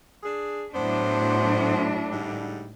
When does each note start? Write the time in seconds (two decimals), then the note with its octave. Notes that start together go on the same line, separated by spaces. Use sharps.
0.24 D4 G#4
0.75 A2 F#3 B3 D4 C5
2.12 G#2 D3 G3